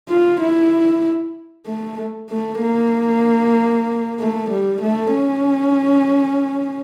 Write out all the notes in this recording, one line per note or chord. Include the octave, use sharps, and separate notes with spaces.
F4
E4
A3
A3
A#3
A3
G3
A3
C#4